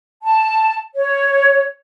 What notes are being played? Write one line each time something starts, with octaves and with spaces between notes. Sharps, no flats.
A5
C#5